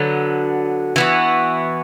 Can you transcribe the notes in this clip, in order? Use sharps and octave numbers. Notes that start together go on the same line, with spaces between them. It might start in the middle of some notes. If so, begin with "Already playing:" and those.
Already playing: D3 F#3 B3
E3 B3 F#4